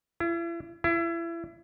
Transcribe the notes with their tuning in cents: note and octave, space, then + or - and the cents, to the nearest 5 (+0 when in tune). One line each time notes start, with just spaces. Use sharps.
E4 +40
E4 +30